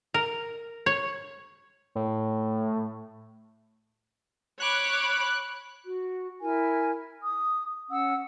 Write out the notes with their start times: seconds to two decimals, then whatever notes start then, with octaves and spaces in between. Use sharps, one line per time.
0.14 A#4
0.86 C#5
1.95 A2
4.60 C#5 B5 D6 F#6
5.86 F#4
6.41 E4 A#4 G#5
7.21 D#6
7.90 C#4 F#5 E6